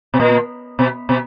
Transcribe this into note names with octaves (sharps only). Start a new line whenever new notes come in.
B2
A#2
B2
B2